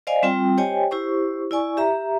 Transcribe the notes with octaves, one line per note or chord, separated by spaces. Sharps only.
C5 D5 D#5 F5 G#5
G3 C4 F4 G5
G4 C5 C#5 D#5 G5 G#5
E4 G4 C5 C#6
E4 D5 G#5 C#6
G4 E5 A#5